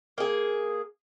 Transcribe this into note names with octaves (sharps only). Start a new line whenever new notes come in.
A#3 G#4